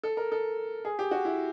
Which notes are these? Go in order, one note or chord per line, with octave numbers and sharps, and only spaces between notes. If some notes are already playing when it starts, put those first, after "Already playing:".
A4
A#4
A4
G#4
G4
F#4
E4